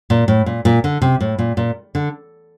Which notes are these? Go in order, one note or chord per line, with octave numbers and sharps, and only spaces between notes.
A#2
A2
A#2
A#2
D3
C3
A2
A#2
A#2
D3